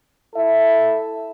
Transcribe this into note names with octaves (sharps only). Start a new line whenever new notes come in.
E4 A4 E5